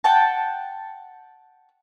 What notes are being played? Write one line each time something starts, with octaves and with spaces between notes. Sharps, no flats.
F#5 G5 A5